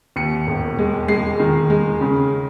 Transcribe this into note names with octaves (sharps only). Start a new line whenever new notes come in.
D#2 C#7
E1
G#3
G#3 C7
D#3
G#3
C#3